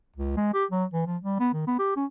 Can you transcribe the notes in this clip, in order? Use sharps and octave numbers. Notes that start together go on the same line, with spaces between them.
C#2
G#3
G4
F#3
E3
F3
G3
B3
D#3
B3
G4
C#4